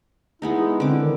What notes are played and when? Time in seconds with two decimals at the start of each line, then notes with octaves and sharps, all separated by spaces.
0.42 G#3 B3 D#4 E4
0.80 D3 C4 D6
1.00 D#3